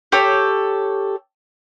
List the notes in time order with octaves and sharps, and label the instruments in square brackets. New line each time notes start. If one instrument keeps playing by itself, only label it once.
[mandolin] G4 A4 C#5